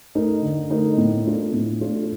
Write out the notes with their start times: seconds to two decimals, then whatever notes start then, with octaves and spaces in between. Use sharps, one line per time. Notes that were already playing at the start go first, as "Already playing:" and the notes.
0.15 A3 D#4 A#4
0.42 D3
0.70 A3 D#4 A#4
0.97 A2
1.26 A3 D4 F4
1.53 A2
1.81 A3 D4 F4